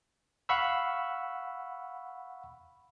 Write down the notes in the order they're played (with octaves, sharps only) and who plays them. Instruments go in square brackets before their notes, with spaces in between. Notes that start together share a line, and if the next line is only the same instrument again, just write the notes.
[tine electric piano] F5 F#5 B5 C#6 E6